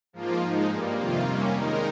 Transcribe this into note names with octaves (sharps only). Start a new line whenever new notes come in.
G#2 F3 A#3 F4
F3 G#3 D#4
G2 G3 A#3
F2 C3 D#3 A#3 F4
C3 G3 A#3 C#4
D#3 G#3 D#4 A#4